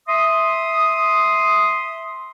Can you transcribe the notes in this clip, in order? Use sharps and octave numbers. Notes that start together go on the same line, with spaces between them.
E5 C6 D#6